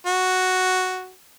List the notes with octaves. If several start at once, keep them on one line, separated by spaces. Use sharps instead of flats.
F#4